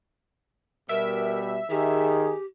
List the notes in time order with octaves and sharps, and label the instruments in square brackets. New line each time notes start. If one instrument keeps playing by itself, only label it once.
[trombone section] B2 G3 [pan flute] A#4 [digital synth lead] E5
[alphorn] D#3 [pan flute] G4 [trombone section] G#4